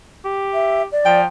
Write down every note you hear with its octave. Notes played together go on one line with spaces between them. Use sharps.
G4
E5
D5
F3 G5